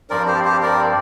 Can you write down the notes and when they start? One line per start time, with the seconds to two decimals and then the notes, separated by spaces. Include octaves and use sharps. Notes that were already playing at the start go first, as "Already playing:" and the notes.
0.10 G2 F3 C4 A#4 D5
0.27 G4 C5
0.45 G4 C5
0.63 A#4 D5